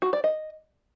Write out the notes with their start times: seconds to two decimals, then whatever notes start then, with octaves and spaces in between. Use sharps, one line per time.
0.02 F#4
0.13 D5
0.24 D#5